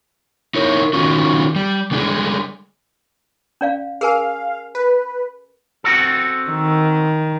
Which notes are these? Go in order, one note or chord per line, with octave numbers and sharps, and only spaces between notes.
D#4 E4 A#4 C#5
D#3 C#4 D#4 F4 F#4
G3
D3 G3 G#3 D4 G#4
C#4 D5 F5
G#4 A#4 F5 G#5
B4
C4 F#4 A4
D#3